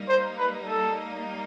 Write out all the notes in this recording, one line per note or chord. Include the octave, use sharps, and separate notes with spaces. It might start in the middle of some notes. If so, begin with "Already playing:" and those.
Already playing: G3 A#3 D#4
C5
B4
A4